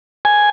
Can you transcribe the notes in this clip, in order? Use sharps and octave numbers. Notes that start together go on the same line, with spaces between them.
G#5